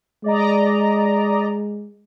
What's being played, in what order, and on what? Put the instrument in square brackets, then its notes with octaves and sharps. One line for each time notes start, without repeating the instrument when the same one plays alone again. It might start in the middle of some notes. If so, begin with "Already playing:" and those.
[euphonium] G#3 [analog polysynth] D5 D#5 A#5